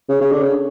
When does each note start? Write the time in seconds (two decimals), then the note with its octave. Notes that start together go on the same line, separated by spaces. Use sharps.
0.09 C#3
0.21 C#3
0.32 D3
0.43 C#3